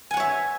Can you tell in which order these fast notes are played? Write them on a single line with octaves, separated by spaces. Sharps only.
G#5 F#5 C#5 E5